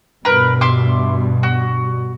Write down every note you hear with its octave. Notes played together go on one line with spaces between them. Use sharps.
G2 B2 A#4 B4
E5 C6 D6
F#4